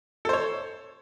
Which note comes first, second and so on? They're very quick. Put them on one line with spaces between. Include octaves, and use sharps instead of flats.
A4 C5 C#5